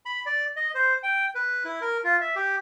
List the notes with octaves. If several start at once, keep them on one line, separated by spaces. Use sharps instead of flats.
B5
D5
D#5
C5
G5
B4
E4
A#4
F4
E5
G4